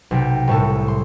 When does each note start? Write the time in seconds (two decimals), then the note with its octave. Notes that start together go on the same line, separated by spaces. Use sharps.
0.11 B1 C3 G5
0.48 C2 A2 A4
0.88 C6